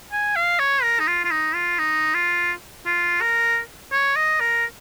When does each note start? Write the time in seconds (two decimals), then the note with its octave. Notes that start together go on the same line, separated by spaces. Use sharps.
0.12 G#5
0.36 F5
0.59 C#5
0.83 A#4
0.99 D#4
1.07 F4
1.24 F4
1.31 D#4
1.55 F4
1.79 D#4
2.14 F4
2.86 F4
3.21 A#4
3.92 C#5
4.16 D#5
4.40 A#4